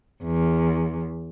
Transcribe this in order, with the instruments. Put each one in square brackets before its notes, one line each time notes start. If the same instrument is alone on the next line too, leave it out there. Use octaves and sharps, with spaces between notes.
[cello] E2